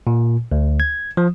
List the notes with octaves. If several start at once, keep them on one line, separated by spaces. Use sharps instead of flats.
A#2
D2
G#6
F3